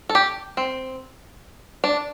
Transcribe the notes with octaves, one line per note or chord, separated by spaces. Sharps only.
A4
G4
C4
D4